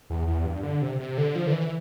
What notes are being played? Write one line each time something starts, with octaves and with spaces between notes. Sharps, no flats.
E2
E2
G2
D3
C3
C3
D3
F3
D3
E3